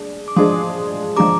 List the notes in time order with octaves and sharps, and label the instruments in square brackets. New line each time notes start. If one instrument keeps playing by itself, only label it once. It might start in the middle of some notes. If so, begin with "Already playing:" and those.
Already playing: [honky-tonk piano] D4 G#4
[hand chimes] D6
[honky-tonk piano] F3 G#3 D4 G#4 [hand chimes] C6 D#6
[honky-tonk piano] F3 G#3 D4 G#4 [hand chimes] A#5 D6